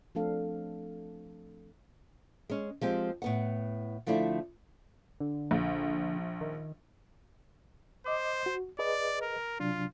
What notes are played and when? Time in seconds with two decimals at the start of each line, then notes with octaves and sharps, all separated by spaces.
0.15 F3 A3 C4 D4 A4 F5
2.50 G#3 C#4
2.81 F3 G#3 C4 G4
3.22 A2 B3 F#5
4.06 D3 F3 A3 D4 E4
5.20 D3
5.51 A#1
6.41 D#3
8.06 C5 D#5 D6
8.46 F#4
8.79 G#4 B4 D5 D#5
9.22 A#4
9.60 C3 F#3 D4 F4